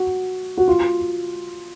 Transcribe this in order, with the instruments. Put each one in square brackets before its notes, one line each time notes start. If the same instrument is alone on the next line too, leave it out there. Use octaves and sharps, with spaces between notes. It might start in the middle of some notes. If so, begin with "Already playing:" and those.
Already playing: [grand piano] F#4
F#4
F4